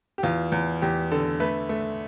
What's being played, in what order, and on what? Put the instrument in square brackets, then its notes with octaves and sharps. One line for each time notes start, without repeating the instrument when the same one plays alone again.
[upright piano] G4
E2 F4
E2
E2 G4
D3 A4
A3 B4
A3